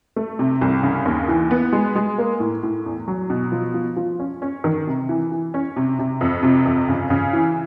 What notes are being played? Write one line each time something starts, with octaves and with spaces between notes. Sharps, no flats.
A3
C3
C2
C#3
D#2
E3
B3
G#3
G#3
A#3
A2
A2
E2
F#3
B2
F3
F3
F3
C#4
C#4
D#3
C3
E3
E3
C#4
C3
C3
F2
C3
F2
C#3
C#3
E3